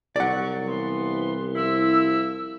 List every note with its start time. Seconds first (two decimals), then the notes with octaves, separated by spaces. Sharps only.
0.16 C2 F#3 D5 F#5 C#6
0.67 E3 F3 B3 C6
1.56 F3 E4 E6